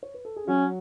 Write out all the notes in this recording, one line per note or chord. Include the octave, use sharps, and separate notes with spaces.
C#5
B4
A4
G#4
F#3 C#4 F#4